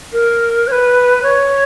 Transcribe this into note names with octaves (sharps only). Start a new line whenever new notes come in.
A#4
C#5
B4
C#5